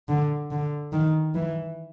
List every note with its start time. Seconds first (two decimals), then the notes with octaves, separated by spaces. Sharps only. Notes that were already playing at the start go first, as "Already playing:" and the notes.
0.09 D3
0.51 D3
0.92 D#3
1.35 E3